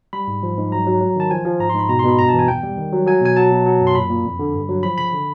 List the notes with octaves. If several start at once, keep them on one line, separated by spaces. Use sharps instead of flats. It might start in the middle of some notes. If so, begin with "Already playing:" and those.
G3 B5
G#2
F3
G#2
F#3 A#5
F#3
F#3
D#3 A5
F3 G#5
F3
G#2 A#5
C6
G#2 B5
B2 A#5
C6
B2 B5
G2 A#5
A5
E3
G#5
E2 G5
G3
D#3
F#3
F#3 G#5
B2 G#5
F#3 A5
B2
F#3
F#2
C6
A#2 B5
A#2
F2
D3
G2
F#3
F3 B5
C#3 B5
D3